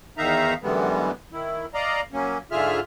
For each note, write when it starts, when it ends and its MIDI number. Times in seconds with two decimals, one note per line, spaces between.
0.18 0.54 40
0.18 0.54 51
0.18 0.54 63
0.18 0.54 76
0.18 0.54 77
0.18 0.54 82
0.63 1.11 42
0.63 1.11 50
0.63 1.11 52
0.63 1.11 55
0.63 1.11 56
0.63 1.11 59
1.33 1.66 51
1.33 1.66 64
1.74 2.01 74
1.74 2.01 75
1.74 2.01 77
1.74 2.01 82
2.13 2.38 54
2.13 2.38 58
2.13 2.38 61
2.51 2.80 44
2.51 2.80 50
2.51 2.80 65
2.51 2.80 68
2.51 2.80 76
2.51 2.80 89